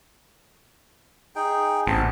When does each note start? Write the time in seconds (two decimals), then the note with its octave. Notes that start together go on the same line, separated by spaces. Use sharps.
1.36 D#4 G#4 G5
1.87 A1 B3 C4 A5